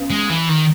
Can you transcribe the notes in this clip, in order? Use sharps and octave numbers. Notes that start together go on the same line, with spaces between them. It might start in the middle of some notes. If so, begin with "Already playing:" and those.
Already playing: C#2 C#3 B3
G#3
E3
D#3